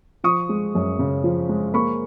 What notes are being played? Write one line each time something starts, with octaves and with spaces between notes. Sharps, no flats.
F3 C#6 D#6
G#3
F#2
C#3
F3
G#3
A#3 B5 C#6